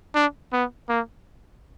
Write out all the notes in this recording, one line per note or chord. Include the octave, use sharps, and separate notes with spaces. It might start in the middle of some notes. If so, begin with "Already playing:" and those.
D4
B3
A#3